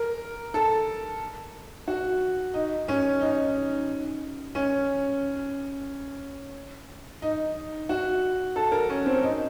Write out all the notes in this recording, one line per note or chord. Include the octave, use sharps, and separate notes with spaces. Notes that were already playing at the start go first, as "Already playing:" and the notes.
Already playing: A#4
A4
F#4
D#4
C#4
D#4
C#4
D#4
F#4
A4
A#4
C#4
C4
D#4